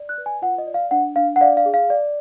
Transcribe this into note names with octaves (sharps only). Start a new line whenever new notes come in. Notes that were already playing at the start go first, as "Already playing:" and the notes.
Already playing: D5
F#6
B4
G#5
F4 F#5
D#5
D5
F5
D4 F#5
D4 F5
F#5
D5 F5
F5
G#4
F5
D5